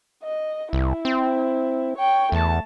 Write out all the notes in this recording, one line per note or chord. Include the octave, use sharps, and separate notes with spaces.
D#5
C2 E4
C4
C#5 G5
E2 A3 A5